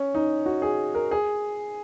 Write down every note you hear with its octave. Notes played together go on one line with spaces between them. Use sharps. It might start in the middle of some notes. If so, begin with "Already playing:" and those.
Already playing: C#4
D#4
F#4
G#4
A#4
G#4